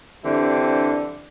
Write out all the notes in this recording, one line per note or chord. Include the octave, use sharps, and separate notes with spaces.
D3 E3 G3 C4 D4